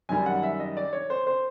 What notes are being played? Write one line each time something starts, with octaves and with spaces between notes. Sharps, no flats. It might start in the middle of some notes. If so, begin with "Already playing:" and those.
F#2 D#3 G3 G#5
F#5
E5
D#5
D5
C#5
C5
C5